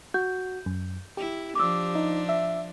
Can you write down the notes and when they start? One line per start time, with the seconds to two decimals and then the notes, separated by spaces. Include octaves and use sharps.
0.14 F#4 G6
0.66 F#2
1.17 E4 G4
1.55 F3 D4 D6 E6
1.95 D#4
2.29 E5